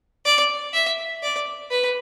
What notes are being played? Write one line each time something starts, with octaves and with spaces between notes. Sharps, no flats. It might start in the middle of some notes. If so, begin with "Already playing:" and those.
D5
E5
D5
B4